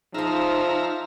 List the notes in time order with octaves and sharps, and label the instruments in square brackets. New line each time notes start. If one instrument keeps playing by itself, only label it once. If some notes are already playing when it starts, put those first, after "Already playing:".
[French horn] F3 [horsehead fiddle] D#4 [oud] G#4 C5 [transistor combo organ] E5 F5 A#5